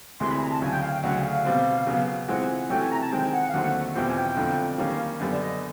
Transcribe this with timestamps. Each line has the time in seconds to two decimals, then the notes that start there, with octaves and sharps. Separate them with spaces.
0.20 D2 C3 E3 G#3 C6
0.30 B5
0.41 A#5
0.51 A5
0.62 D2 C#3 F#3 G#5
0.72 G5
0.82 F5
0.93 G5
1.03 D2 C#3 F#3 F#5
1.25 F5
1.45 B2 G3 C4
1.87 C#3 F#3 B3
2.28 E3 G#3 C4 F4 F#5
2.70 C3 E3 A3 C#4 F#4 G5
2.80 G#5
2.90 A#5
3.01 A5
3.12 D#3 G#3 C4 G5
3.33 F#5
3.49 F5
3.53 D#2 D3 F#3 A3 C4 F#5
3.95 E2 B2 G3 C4 F4 G5
4.10 G#5
4.16 G5
4.36 F2 D3 F3 A3
4.78 D#3 G3 A#3 C#4 F5
5.20 F#2 D3 G3 B3
5.31 D5
5.40 D#5